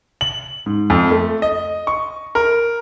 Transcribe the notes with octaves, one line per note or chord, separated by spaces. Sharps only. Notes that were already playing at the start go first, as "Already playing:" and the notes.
F#7
G#2
F2
A3
D#5
C#6
A#4